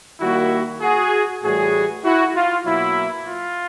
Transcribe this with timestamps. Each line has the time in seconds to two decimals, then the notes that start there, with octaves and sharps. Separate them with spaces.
0.20 D#3 G3 A#3 E4 F#4
0.81 F#4 G#4
1.42 A2 E3 G3 F#4 G#4
2.04 E4 F#4
2.36 F4
2.65 B2 F#3 A#3 E4
3.27 F4